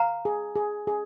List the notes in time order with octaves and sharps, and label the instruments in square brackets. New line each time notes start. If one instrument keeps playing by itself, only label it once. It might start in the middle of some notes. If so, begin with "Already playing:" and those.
Already playing: [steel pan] F5 [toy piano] A#5
[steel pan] G#4
G#4
G#4